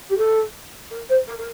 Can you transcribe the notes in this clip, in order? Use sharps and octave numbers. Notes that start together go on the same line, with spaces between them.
G4
A4
A#4
C5
A#4
A#4